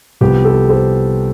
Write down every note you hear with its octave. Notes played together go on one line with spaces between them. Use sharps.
C2 C3 F3 B3 G4
A4
A4 C5